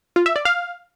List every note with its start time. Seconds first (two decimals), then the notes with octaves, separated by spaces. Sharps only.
0.16 F4
0.26 E5
0.36 D5
0.45 F5